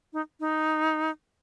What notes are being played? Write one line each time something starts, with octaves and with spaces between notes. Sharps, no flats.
D#4
D#4